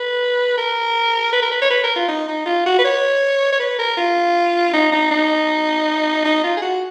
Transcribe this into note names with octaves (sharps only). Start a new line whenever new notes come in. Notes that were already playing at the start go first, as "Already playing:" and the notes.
Already playing: B4
A#4
B4
A#4
B4
C#5
B4
A#4
F4
D#4
D#4
F4
F#4
B4
C#5
C#5
B4
A#4
F4
D#4
D#4
D#4
D#4
F4
G#4
F#4